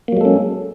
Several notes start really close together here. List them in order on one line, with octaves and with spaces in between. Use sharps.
A#3 F#3 G#3 A4 C#4